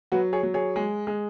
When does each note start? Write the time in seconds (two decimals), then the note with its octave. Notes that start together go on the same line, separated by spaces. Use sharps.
0.12 F#3 F#4 B4
0.33 G#4 C#5
0.43 F#3
0.54 G#4 C#5
0.76 G#3
1.07 G#3